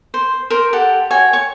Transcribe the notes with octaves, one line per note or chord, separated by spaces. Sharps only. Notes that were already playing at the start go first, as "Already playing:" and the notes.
C5
A#4 C5
G4 A4 F#5
F#4 C#5 G5 G#5
C#5 C#6